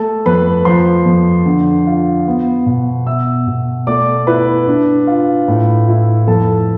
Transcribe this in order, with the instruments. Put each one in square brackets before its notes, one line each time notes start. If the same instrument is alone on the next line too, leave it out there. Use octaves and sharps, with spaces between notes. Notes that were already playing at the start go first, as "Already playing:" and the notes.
Already playing: [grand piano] A3 A4 A5
F2 B4 B5
F3 C5 C6
F2
D3
F4
B3
B2
B2 E5 E6
B2
A3 D5 D6
E4 B4 B5
D4
F4
A2
E4
F2 A4 A5